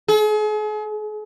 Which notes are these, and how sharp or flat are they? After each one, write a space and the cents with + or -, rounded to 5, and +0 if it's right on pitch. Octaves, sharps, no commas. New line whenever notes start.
G#4 +40